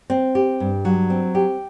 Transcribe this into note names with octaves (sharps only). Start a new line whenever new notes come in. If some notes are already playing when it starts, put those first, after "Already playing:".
C4
G4
G2
F#3
C4
G4